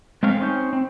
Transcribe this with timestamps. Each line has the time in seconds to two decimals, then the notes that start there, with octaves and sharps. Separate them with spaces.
0.23 G#3 A3 C4 F5
0.39 C4 C#4 D#4 C5
0.73 C4